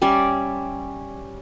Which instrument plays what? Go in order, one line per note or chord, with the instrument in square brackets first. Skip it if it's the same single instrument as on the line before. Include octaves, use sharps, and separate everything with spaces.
[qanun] G3 C#4 D5 E5